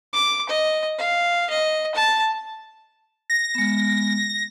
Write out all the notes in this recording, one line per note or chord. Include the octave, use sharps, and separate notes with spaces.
D6
D#5
F5
D#5
A5
A#6
G#3 B3